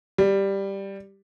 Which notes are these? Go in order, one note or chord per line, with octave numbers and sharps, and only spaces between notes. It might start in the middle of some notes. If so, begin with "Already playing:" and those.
G3